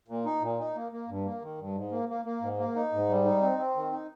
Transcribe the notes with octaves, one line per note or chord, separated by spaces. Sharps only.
A#2
D#4
A#2
D#4
A#3
A#3
G2
A#3
D#3
G2
G#2
A#3
A#3
A#3
G#2
A#3
D#4
G#2
G3
D#4
C4
C4
D#3
D#4